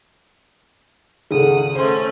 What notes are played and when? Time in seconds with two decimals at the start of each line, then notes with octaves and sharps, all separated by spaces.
1.31 G#1 C#2 G#4 A4 F#5 D#6
1.75 A3 C#4 C5 C6